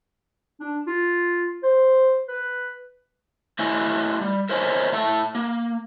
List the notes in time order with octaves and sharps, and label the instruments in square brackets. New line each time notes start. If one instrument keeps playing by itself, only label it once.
[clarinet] D4
F4
C5
B4
[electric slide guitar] A3 E4 B4 D#5 E5 G#5
G3
A#4 C5 C#5 D#5 G#5
A2 E5 A5
A#3